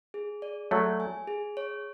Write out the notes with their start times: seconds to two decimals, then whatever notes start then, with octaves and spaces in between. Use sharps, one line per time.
0.14 G#4
0.42 D5
0.71 F#3 A3 C#5
1.00 G#5
1.27 G#4
1.57 C#5